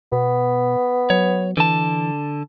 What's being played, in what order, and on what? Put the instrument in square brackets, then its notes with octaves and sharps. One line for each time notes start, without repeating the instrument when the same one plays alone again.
[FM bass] B2 [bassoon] B3
[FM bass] F#3 [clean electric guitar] C#5
[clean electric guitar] D3 A5 [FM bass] E3